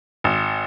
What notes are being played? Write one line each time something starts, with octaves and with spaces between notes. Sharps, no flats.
G#1